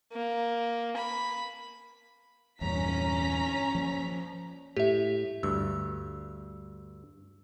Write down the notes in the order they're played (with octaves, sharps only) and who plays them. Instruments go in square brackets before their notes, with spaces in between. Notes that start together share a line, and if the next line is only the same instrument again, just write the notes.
[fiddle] A#3
B5
[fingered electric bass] E2 G2 A#2 [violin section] C#4 A#5 B6
[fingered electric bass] F3 A#3
[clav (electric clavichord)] A2 [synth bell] G4 E5
[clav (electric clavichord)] D2 G2 [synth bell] E6